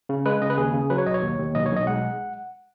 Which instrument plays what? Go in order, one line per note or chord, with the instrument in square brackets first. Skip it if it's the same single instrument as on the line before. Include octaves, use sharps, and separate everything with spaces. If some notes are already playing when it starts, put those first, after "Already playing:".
[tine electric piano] C#3
G#3 B4
C#3 D#5
B4
D#2 G#4
C#3
F#3 B4
C#5
B1 D#5
C#5
D#2
D#2
B1 D#5
C#5
B1
D#5
G#3 F#5